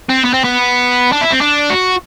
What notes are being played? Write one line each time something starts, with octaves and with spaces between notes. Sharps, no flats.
C4
B3
C4
B3
D4
E4
C4
D4
F#4